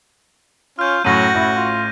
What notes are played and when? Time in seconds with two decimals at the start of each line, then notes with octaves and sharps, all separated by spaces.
0.79 C#4 F4 F6 G6
1.04 F#2 A2 F#3 F#4 F6 A#6 D#7
1.35 A1 A2 E4
1.57 F4